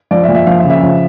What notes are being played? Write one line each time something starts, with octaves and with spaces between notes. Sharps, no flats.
F3 D5
E5
A#2
E5
F3 F5
E5
C#3
E5
F3